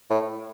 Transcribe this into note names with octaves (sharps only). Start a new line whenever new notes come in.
A2